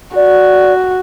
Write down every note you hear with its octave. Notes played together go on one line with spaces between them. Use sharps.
F#4 D5